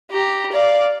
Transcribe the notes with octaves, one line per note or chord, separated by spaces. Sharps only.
G4 A#5
D5 F5